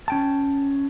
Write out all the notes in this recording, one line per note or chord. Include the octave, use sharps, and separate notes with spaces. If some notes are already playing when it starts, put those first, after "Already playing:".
C#4 G5 A5